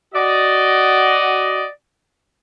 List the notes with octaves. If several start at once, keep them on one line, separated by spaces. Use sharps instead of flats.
F#4 D5 D#5